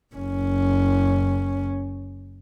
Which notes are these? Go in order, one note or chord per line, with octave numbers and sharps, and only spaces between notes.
F#1 C#4